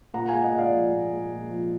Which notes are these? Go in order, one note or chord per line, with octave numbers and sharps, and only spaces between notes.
A#2 F#5 A#5
G#3 F5 G#5
D#5 F#5
A#2
D5 F5
F3
A#2
G#3
A#2
F3